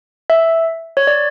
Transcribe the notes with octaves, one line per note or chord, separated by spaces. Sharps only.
E5
C#5
D5